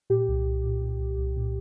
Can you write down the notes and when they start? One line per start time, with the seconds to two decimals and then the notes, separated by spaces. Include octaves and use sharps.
0.10 A#2 G4
0.28 C2
0.46 C2
0.64 A#2
0.82 A#2
0.99 C2
1.17 C2
1.36 A#2